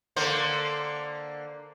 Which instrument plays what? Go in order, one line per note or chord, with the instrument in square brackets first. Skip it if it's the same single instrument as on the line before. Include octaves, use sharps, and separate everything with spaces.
[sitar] D3 A#3 C5